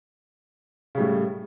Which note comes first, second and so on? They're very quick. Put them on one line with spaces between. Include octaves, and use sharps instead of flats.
C#3 G3 A2